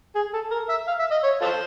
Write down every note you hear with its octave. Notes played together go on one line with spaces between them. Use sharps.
G#4
A4
A#4
E5
F5
E5
D#5
C#5
F4 A4 C5